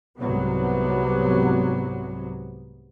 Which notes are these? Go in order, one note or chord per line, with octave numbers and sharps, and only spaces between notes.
C2 G#2 C3 F#3 B3